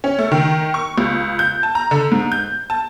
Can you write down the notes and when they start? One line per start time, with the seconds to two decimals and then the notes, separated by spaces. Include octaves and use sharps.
0.04 C#4
0.19 A3
0.32 D#3
0.74 C#6
0.98 C#2
1.39 G6
1.63 A5
1.75 A#5
1.91 D3
2.12 G#2
2.32 G6
2.70 A5